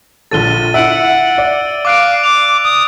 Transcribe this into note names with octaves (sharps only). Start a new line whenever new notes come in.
A#1 D3 A4 A6 D#7 G7
E4 E5 F#5 E6 D7
D5
F5 D6 F#6 D7
D6 F7
D#6